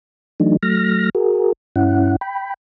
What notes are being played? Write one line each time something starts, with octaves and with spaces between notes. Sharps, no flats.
E3 F#3 A3 D4 D#4
F#3 A3 F6 A#6
F#4 G#4 A#4
G2 C#4 E4 F#5
G5 B5